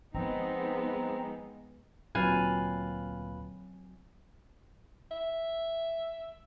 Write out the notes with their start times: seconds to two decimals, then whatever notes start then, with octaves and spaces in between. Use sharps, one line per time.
0.14 F3 G#3 B3 C4 D#4 A#5
2.15 D2 A#2 F#3 C4 F4 B4 G#5
5.11 E5